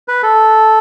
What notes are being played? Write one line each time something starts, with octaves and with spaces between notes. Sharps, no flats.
B4
A4